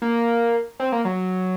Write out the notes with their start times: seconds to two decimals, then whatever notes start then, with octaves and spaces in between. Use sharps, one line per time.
0.02 A#3
0.80 C4
0.92 A#3
1.05 F#3